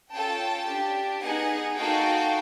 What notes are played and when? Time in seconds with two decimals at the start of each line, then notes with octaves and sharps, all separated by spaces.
0.12 C#4 F4 A4 G5 A5
0.67 D4 G4
1.22 B3 D#4 G#4 F#5 G#5
1.77 A#3 D#4 F#4 A4 F5 G5